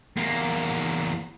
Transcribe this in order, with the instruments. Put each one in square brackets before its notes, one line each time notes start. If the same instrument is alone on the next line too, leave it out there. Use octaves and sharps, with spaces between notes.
[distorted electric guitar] E2 A#3